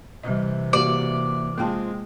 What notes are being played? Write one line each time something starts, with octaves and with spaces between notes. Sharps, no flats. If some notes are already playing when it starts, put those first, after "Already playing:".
C3 E3 G3 D#5
A#3 F#4 G4 D5
G#3 A#3 C4 F4 G5 A5